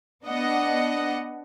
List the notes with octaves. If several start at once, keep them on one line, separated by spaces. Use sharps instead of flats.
B3 D4 D#5 F#5